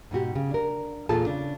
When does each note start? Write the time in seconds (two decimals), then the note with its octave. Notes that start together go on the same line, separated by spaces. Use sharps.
0.11 G#2 B2 F#4 G4
0.35 C#3
0.51 D4 A#4
1.09 E2 A#2 F4 G#4 A4 A5
1.26 C#3 D4